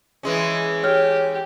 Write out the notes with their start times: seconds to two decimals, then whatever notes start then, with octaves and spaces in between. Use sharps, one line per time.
0.23 E3 G#3 C#4
0.83 G4 C#5 F6